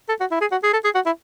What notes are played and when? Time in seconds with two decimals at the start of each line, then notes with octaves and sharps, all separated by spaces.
0.09 A4
0.20 F#4
0.31 E4
0.41 G#4
0.52 F#4
0.63 G#4
0.73 A4
0.84 G#4
0.95 F#4
1.06 E4